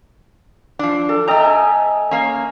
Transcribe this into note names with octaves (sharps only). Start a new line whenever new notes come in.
F3 D4
A4
A3 A4 D#5 G5 A#5
G#5
A#3 C#4